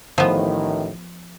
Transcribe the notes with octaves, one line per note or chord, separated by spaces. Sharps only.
A1 A2 D#3 F3 B3